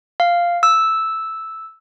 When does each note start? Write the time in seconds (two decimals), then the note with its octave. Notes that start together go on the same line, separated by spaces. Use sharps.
0.20 F5
0.63 E6